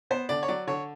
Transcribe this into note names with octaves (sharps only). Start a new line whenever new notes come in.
B3 C5
D3 D5
C#5
F#3 D5
D3 C#5